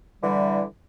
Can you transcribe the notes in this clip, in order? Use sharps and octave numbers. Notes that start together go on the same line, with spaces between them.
D3 E3 G3